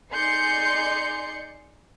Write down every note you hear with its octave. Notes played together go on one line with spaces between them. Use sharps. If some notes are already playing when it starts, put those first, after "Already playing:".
D#4 G#4 D5 C6 G6 C#7